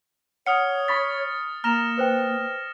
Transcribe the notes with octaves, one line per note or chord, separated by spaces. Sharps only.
C#5 F#5 D#6 F6 C#7
B5 C#6 A6 B6
A#3 A#5 F6 A#6 E7 F7
B4 C5 G5